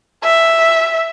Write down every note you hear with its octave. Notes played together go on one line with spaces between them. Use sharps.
E5